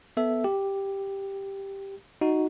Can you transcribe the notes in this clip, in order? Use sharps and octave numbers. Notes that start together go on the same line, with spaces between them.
B3 A4 E5
G4
D#4 F#4